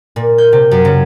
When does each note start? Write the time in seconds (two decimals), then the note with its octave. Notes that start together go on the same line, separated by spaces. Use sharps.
0.16 A#2
0.38 G6
0.53 C3
0.71 F#2
0.85 C#3